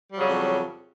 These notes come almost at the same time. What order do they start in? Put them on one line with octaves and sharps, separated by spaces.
G3 F#3 C#3 F2